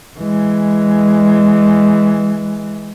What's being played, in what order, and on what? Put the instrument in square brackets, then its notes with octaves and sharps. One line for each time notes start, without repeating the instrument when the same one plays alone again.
[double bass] E3 G#3